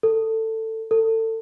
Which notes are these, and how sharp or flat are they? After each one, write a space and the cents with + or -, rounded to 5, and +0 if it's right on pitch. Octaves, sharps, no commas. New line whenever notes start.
A4 +15
A4 +25